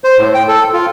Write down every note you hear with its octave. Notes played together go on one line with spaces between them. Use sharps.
C5
A2
G5
A4
F4